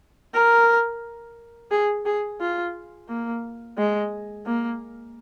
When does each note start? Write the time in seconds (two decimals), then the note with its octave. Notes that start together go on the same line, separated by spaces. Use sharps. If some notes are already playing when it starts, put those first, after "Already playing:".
0.34 A#4
1.71 G#4
2.06 G#4
2.41 F4
3.09 A#3
3.78 G#3
4.46 A#3